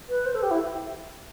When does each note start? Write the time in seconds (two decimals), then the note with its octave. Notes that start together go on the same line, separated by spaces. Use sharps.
0.09 B4
0.26 C5
0.35 A4
0.43 G4
0.51 E4